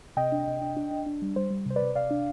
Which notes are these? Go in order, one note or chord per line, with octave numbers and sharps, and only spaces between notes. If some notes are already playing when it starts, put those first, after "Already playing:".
C3 D#5 G5
D4
C3
D4
D4
D4
D4
G3
G3 C5
G3
C3 C5
B4 D5
C3
C3 D5 F5
D4